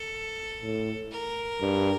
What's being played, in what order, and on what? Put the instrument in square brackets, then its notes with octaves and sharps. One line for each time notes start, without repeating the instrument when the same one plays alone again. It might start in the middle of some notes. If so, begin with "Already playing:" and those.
Already playing: [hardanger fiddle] A4
[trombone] A2
[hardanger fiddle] A#4
[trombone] G2